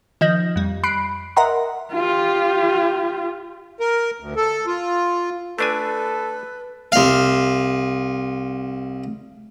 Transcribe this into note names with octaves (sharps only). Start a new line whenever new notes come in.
D#3 F3 D#5 G6 A#6
F2 G3
B5 F#6 C7 D7
A#4 D#5 E5 F#5 A#5 C6
F4 G4
A#4
D2
A4
F4
A3 D4 A4 B4 G#5
C2 F5